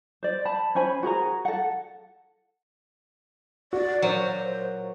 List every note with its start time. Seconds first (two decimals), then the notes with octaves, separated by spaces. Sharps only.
0.23 C5 D5
0.45 A5 B5
0.75 C#4 C5 G#5 B5
1.03 F#4 G#4 A#4 A#5
1.45 A4 F#5
3.73 F#4 D5
4.02 A#2 F#3 C5